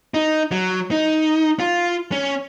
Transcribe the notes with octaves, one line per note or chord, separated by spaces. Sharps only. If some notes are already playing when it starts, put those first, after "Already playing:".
D#4
F#3
D#4
F4
C#4